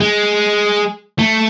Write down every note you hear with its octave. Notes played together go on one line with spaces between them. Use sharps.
G#3
A3